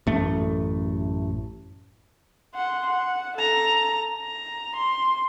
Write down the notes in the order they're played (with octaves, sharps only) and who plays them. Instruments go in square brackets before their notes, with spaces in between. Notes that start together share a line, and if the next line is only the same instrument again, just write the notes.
[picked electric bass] A1 F#2 A3
[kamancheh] F#5 C6
F#5
A4 A#5
A#5
C6